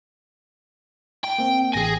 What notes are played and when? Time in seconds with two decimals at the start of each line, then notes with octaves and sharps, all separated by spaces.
1.24 G5
1.39 A#3 C4
1.74 A1 G#4 G#5 A#6